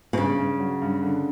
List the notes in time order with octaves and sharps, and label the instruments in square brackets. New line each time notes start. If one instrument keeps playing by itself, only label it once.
[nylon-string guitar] B2
[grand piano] G2 [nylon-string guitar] C#3
[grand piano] G2
F#3
G2
D3